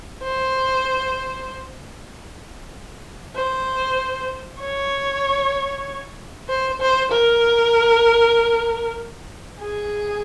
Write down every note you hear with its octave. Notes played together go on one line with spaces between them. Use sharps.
C5
C5
C#5
C5
C5
A#4
G#4